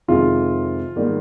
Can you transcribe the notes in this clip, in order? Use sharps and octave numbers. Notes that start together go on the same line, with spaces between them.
F2 C3 D#3 G#3 F4
G#2 D#3 G3 A#3